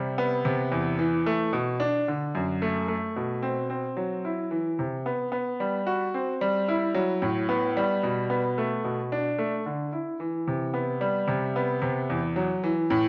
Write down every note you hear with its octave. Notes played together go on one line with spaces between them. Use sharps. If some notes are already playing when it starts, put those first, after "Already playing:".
Already playing: C3 G3
B3
C3
E2
E3
A3
B2
D4
D3
F#2
A3
A3
B2
C4
C4
F#3
E4
E3
C3
B3
B3
G3
F#4
C4
G3
E4
F#3
A2
B3
G3
B2
B3
A3
B2
D4
A3
D3
E4
E3
C3
B3
G3
C3
B3
C3
E2
F#3
E3
A2